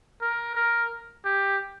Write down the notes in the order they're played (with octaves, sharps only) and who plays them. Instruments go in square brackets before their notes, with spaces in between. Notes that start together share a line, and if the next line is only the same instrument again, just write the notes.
[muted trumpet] A#4
A#4
G4